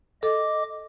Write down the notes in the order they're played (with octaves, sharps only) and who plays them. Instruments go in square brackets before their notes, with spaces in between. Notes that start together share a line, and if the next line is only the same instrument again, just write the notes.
[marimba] A4 [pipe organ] D#5 D6